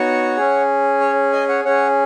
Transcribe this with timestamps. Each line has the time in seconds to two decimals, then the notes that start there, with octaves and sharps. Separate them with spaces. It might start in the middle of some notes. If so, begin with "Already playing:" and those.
Already playing: B3 D#4 F#4 C#5 F#5
0.37 C#4 G#4
1.00 C#5
1.32 D#5 G#5
1.49 C#5 F#5
1.65 C#4 G#4 C#5 F#5